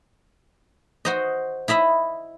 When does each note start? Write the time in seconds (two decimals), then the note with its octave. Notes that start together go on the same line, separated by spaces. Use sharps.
1.05 F#4 C5 D#5
1.68 E4 D#5 E5 B5